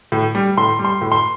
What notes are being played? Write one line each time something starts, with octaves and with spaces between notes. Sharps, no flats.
A2
G3
A2 C6
G3
C6
A2
C6